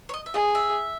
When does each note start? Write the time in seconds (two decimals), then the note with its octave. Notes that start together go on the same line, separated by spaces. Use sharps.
0.09 C#5
0.14 D#5
0.26 E5
0.34 G#4 D#5
0.55 E5